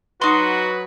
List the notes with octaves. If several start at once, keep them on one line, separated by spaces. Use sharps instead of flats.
F#3 D#4 F#4 B4 C6